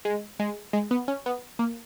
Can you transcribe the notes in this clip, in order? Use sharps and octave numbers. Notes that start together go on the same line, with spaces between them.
G#3
G#3
G#3
B3
C#4
B3
A#3